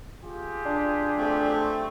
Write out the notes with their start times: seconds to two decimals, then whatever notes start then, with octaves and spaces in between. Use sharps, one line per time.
0.22 F4 G4 G#4
0.66 D4
1.17 A3 C4